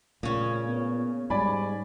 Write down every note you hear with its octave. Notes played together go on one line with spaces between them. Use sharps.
A#2 C#3 A3 C#4
B3
G#2 G3 D5 G#5 B5